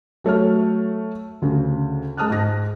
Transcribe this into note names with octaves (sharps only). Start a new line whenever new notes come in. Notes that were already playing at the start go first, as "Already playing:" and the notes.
F#3 A3 C#5 F6
D2 C#3
G#3 A5 D#6 F6 F#6
G#2 A#6